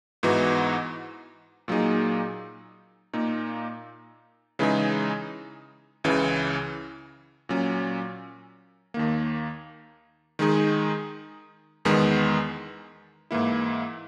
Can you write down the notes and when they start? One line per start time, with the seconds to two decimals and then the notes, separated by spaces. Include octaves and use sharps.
0.23 G#2 E3 B3 D#4 F#4
1.68 A#2 F#3 A#3 D#4 G#4
3.13 A#2 A#3 D#4
4.59 C#3 E3 G#3 D#4 G#4
6.04 C#2 C#3 E3
7.49 A#2 F#3 C#4
8.94 D#2 D#3 A#3
10.39 D#3 G#3 D#4 G#4
11.85 E2 D#3 G#3 B3
13.31 G#2 E3 A#3 E4